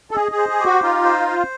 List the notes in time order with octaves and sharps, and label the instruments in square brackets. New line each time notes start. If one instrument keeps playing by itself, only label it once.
[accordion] A4
[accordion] G#4 [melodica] D#5
[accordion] G#4
[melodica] C5
[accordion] G#4
[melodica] G4
[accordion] F#4
[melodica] D#4 [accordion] F4
[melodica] C5
C5